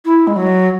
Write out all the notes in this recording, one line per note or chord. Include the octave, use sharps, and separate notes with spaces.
E4
G#3
F#3